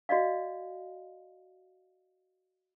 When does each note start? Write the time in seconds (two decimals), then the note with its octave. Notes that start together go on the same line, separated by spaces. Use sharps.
0.09 F#4 D5 D#5 F5